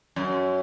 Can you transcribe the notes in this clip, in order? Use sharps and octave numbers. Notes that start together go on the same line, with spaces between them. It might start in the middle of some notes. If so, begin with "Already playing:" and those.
F#2